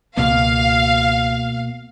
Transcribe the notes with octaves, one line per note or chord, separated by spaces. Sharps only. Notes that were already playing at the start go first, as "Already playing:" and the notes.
C#2 B2 A#3 F5